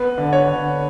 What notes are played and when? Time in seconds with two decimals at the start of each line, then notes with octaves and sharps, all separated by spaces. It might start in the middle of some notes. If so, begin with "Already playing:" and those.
Already playing: B3 B4
0.18 D3
0.33 C#5
0.48 D3